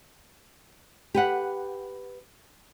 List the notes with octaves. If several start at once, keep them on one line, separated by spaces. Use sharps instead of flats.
G4 B4 F#5